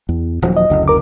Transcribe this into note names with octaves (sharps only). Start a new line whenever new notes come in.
E2
D#1 F3 F#3
D#5
F#1 D2
A#4 D6